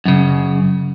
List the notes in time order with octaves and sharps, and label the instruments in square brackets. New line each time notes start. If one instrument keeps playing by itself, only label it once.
[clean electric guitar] F#2 C#3